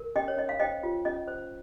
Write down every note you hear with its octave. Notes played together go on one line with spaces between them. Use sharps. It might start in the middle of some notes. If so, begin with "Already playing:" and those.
Already playing: A#4
C#4 D#5 G5
C#5
C#4 D#5
F5
C5 D#5 G5
F4
C#4 D#5
C5